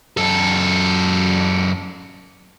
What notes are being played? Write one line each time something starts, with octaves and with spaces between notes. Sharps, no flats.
F#2 A4